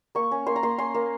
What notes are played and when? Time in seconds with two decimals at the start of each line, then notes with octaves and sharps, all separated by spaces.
0.15 A#3 C#6
0.31 C#4
0.47 A#3 C6
0.56 A#5
0.63 A#3 C6
0.78 C#4 C6
0.94 A#3